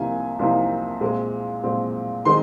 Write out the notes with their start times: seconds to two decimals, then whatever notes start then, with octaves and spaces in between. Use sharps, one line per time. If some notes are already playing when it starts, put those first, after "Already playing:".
Already playing: C2 C3 F3 A#3 D#4 G#5
0.39 C2 C3 F3 A#3 D#4
1.01 A#2 G#3 C4
1.64 A#2 G#3 C4
2.25 D#3 G#3 C4 D#4 C6